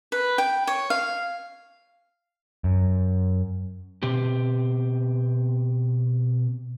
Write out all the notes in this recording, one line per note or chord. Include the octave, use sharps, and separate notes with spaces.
B4
G5
C#5
F5
F#2
B2 C4 G4